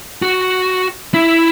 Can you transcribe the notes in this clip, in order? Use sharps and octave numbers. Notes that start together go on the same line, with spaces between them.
F#4
E4